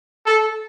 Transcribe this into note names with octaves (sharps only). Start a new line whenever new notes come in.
A4